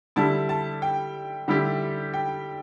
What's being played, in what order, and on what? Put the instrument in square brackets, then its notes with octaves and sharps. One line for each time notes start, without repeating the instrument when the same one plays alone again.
[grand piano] D3 G3 E4 [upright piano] A5
[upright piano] A5
G5
[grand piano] D3 G3 E4 G4
[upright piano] G5